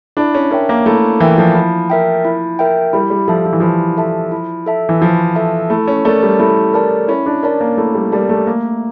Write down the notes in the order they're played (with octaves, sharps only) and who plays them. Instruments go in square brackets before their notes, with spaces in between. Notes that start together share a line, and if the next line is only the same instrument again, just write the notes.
[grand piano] D4 [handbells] E4
[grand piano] C#4
[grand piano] C#4 [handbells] A#4 E5 G5
[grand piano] A#3
[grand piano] A3 [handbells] E4
[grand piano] E3 [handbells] A#4 E5 G5
[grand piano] F3
[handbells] E4
A#4 E5 G5
E4
A#4 E5 G5
[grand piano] G3 [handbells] E4
[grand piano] G3
[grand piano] F3 [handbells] A4 E5 A5
[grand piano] F3
E3
[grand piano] F3 [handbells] E4
[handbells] A4 E5 A5
E4
A4 E5 A5
[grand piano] E3
[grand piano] F3 [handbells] E4
[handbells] A4 E5 A5
[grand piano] A3 [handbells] E4
[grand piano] C#4
[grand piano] A3 [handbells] A#4 D5 A5
[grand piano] G3
[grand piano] A3 [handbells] E4
[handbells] A#4 D5 A5
[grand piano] C#4 [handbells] E4
[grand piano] D4
[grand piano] C#4 [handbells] A#4 D5 A5
[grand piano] A#3
[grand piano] A3 [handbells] E4
[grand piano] G3
[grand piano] G3 [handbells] A#4 D5 A5
[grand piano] A3
[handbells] A3 [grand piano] A#3